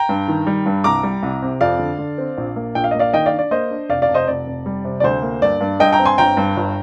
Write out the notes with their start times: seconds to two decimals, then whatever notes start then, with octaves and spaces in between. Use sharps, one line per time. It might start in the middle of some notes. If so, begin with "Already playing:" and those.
Already playing: G5 A#5
0.09 G2
0.28 D#3
0.47 G3
0.66 G2
0.84 C2 A#5 D6
1.03 G3
1.23 C2
1.42 C3
1.61 F2 D5 F5
1.79 D3
1.98 D3
2.18 C4
2.38 A#1
2.56 A#3
2.75 A#1 G5
2.84 F5
2.91 A#3 D#5
2.99 D5 F5
3.13 D#3 D#5 G5
3.26 D5 F5
3.32 D4
3.39 D5
3.51 A#3 C5 D#5
3.71 D4
3.89 F1 D5 F5
4.02 D5 F5
4.08 F1
4.14 C5 D#5
4.28 F1 D5
4.47 F1
4.66 G3
4.85 C3
5.00 D5
5.03 D2 C5
5.22 A#3
5.42 G2 D5
5.60 G2
5.79 G2 D#5 G5
5.92 G5 A#5
5.99 C4
6.05 G#5 C6
6.18 G1 G5 A#5
6.37 G2
6.57 G1